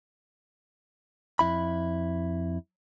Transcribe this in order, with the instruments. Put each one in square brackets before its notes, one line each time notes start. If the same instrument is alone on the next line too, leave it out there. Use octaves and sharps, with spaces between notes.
[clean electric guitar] F2 E4 B5